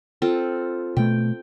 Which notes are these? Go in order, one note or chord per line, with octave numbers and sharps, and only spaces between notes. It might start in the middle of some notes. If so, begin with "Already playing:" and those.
C4 F4 A4
B2 A3 G5